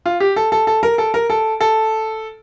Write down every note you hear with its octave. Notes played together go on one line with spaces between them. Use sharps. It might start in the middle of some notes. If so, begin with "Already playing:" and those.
F4
G4
A4
A4
A4
A#4
A4
A#4
A4
A4